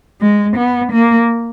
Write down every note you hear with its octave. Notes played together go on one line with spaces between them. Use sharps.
G#3
B3
A#3